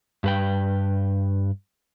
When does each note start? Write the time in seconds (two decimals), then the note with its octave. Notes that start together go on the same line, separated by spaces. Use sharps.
0.24 G2 B4 G5